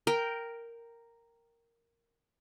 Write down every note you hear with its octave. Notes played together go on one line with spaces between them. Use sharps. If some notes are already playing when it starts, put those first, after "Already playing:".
A#4 G5